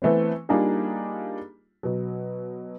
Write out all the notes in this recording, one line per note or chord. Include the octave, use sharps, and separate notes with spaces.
E3 A3 B3 C4
G3 A#3 D4 D#4 F4 G#4
B2 F#3